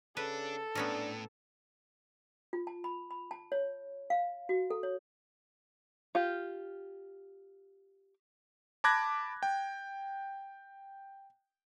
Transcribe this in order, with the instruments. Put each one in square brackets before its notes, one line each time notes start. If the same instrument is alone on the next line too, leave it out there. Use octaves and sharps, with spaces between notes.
[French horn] C#3 [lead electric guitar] D4 [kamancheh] A4 [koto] B4
[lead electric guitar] A2 [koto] B3 C#4 A#4 [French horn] D4
[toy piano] F4
A5
B5
B5
A5
C#5
F5
F#4
A4
C#5
[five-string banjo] F4 G4
[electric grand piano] A5 B5 D6 F#6 G#6 A#6
G5